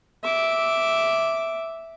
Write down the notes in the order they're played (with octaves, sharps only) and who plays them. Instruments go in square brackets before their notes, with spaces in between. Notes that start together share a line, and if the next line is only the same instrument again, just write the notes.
[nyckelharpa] E5 D6